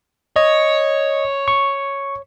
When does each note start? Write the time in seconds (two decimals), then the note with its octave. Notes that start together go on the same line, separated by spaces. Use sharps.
0.36 C#5 D#5
1.48 C#6